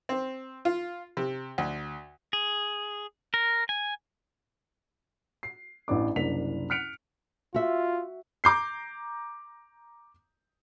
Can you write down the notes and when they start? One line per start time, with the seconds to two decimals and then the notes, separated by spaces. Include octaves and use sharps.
0.09 C4
0.65 F4
1.17 C3
1.58 D2
2.33 G#4
3.34 A#4
3.69 G#5
5.43 C7
5.88 A1 E3 D4 D6
6.16 F#1 C2 D4 B6 F7
6.70 F6 F#6 B6 C#7 D7 F7
7.54 F4 F#4 E5
8.44 A#5 D6 G6 C7